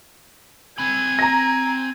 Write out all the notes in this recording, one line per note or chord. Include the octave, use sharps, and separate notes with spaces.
C4 G#5 B5
A#5 A#6